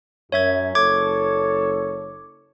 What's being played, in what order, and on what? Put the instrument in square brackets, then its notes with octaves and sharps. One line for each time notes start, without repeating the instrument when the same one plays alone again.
[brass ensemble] F#2 [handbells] C#5 E5 G#6
[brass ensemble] F#1 A4 C#5 [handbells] D6 G#6